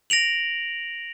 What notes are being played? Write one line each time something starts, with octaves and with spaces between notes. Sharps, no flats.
A#6 D7 F7 F#7